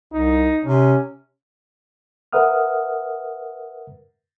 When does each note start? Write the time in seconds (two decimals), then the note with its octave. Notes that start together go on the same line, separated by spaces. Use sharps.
0.13 C2 D#4
0.64 C3 C#4
2.33 A#4 B4 E5 F#5 D#6 F6